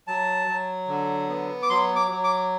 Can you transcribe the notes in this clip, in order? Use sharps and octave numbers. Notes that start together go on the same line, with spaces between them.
F#3 A5
F#3
D3
B3
D6
F#3 C6
D6
F#3
D6